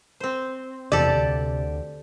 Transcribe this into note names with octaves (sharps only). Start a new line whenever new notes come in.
C4 C5
F#1 E2 C3 E3 G4 A4 D5
D2